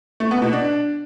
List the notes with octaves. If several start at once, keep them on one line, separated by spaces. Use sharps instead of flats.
A3
B3
B2
D4